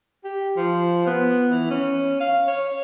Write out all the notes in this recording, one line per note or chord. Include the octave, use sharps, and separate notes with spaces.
G4
F3
B3
E3
C#4
F5
C#5